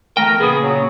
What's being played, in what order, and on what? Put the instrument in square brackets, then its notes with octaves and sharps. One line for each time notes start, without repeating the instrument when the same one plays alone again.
[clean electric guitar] E2 A3 G5 [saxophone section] A#4
[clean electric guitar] A#2 C#3 [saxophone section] B3 G#4
[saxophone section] F#3